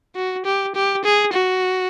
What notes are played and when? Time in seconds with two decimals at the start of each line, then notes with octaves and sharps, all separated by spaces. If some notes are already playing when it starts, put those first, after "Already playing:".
0.16 F#4
0.45 G4
0.75 G4
1.04 G#4
1.34 F#4